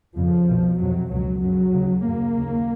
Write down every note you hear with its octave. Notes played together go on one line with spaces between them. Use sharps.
F2 C#3 F3
C2 B2
F2 C3 F#3
C#2 B2 F#3
F#2 C#3 F#3
D#2 C#3
F#2 C#3 A#3
D#2 C#3